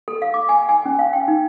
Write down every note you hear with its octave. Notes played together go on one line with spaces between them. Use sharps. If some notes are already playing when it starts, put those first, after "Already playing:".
A4
F5
D6
G#5
G#5
C#4
F5
G5
D#4